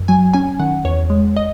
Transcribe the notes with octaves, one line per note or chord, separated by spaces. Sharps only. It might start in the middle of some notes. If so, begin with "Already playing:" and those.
Already playing: F#2
F#3 G#5
C#4 G#5
D#3 F#5
E2 C#5
G#3
D#5